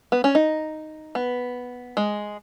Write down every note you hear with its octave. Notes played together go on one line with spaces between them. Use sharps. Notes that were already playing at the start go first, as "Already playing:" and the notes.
B3
C#4
D#4
B3
G#3